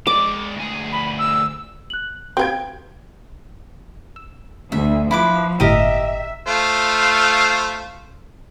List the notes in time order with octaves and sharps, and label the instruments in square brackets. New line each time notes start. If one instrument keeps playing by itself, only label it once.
[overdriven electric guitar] G#3 D5 [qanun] D6
[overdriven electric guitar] D2 G#4
[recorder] B5
E6
[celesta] F#6 F#7
[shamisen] C4 B4 [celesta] F#4 G4 F5 [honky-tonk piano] G5 G#6
[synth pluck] E6
[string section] D2 [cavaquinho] E5
[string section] F3 [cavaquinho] E4 B4 D6
[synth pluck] G1 A2 D#7 [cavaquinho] G4 A#4 D#5 [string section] E5
[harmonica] A3 F4 C5